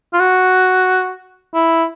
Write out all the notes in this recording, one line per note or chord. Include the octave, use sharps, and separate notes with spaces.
F4
F#4
E4